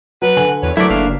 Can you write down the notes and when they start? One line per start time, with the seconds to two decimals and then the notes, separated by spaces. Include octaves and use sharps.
0.22 F#3 F#4 B4
0.36 D3 G#5 F#7
0.63 E2 F#4 B4 C#5
0.77 D3 E3 F#3 A3 E4 A#4 D5 B6
0.90 F#1 A#3 D4 F5